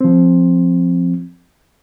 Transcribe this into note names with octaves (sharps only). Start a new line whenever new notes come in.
F3 C4